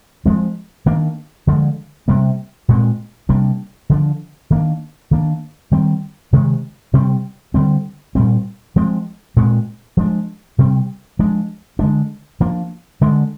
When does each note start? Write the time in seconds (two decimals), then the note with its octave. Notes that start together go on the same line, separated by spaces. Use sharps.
0.25 F3 G#3 C4
0.86 D#3 A#3 D4
1.47 D3 F3 G#3
2.08 C3 G3 A#3
2.69 A#2 G#3 C4
3.29 C3 G3 A#3 D4
3.90 D3 F3 G#3 D4
4.50 D#3 A#3 D4
5.11 D#3 A#3 D4
5.71 D#3 G3 C4
6.33 C3 D#3 G#3
6.93 C3 G3 C4
7.54 D3 G3 C4
8.15 A#2 G3 C4
8.76 F3 G#3 C4
9.36 A#2 G#3 C4
9.97 F3 G#3 D4
10.58 C3 G3 C4
11.19 F3 G#3 D4
11.79 D3 G#3 D4
12.40 F3 A#3 D4
13.01 D3 G#3 D4